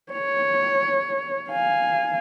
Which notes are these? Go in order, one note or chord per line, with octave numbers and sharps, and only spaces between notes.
C#5
F5 G#5